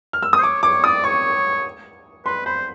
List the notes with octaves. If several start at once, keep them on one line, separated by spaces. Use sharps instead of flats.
F6
E6
D#6
C5
C#5 D6
C#5 D6
D5 D#6
C#5 C#6
B4 C6
C5 B5